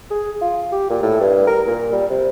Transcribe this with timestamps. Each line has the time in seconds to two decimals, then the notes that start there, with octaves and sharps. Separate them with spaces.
0.11 G#4
0.42 F4
0.72 G4
0.90 A#2
1.03 A2
1.21 G2
1.47 A#4
1.67 A#2
1.92 G3
2.10 C3